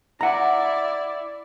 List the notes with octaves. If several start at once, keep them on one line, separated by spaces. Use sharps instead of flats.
E4 D5 F#5 A#5